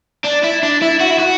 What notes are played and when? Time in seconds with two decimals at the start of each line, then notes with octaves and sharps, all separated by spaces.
0.25 D4
0.44 E4
0.63 D4
0.82 E4
1.01 F#4
1.11 E4
1.19 F#4